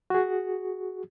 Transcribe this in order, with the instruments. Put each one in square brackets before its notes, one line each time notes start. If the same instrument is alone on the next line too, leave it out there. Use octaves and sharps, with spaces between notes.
[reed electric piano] F#4 G#4